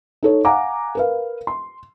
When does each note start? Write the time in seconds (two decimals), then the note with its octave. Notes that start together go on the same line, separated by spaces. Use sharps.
0.23 D#4 A4 C#5
0.45 F5 F#5 G#5 A#5 D6
0.95 A#4 B4 F5
1.47 C6